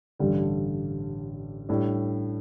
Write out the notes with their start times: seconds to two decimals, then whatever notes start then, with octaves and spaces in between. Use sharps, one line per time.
0.19 A1 G2 D3 G3
1.69 A2 G3 D4